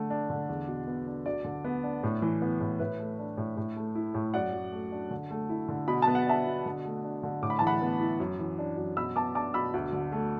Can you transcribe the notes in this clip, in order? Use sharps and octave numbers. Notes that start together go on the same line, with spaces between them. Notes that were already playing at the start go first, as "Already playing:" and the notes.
Already playing: D3 A3
D4
D3
E2
B2
B3
D4
D2 D5
D3
B3
D4
A2
E3
B3
A2
A2 B4 E5
A3
D4
A2
A2
A3
E4
A2
F#2 D5 F#5
F#3
A3
D4
D3
A3
E4
D3
B2 B5
B3 A5
F#5
D4 E5 A5
B2
D3
A3
D4
D3
A2 D6
B5
E3 A5
F#5 B5
B3
E4
F#2
E3
D4
F#2
B2 B5 E6
B3 A5 D6
D4 A5 D6
B2 B5 E6
D2
D3
A3